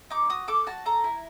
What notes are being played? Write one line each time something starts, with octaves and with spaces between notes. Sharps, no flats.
D#4 D6
F#4 D#6
A4 D6
F#4 A5
A4 A#5
E4